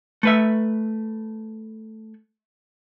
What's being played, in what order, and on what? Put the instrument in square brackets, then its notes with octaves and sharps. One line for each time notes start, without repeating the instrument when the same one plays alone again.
[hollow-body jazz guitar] A3 B4 E5